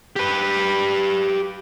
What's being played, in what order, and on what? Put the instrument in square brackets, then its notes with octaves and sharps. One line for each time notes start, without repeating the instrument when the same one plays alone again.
[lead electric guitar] G4 B4